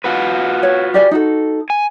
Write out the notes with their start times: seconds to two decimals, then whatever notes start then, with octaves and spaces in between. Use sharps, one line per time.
0.04 F4 F#4 B4
0.63 C#5
0.94 G4 D5 G#5
1.11 D#4 F#4 A4
1.70 G#5